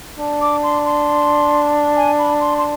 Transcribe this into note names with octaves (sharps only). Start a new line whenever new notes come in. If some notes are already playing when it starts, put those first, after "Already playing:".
D4
D6
C6
C6
G#5
B5
C6
C6